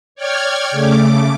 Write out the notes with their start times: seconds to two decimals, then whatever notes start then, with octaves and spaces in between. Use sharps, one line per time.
0.15 C#5 D5 G5 F6 G#6
0.71 C#3 A3 D6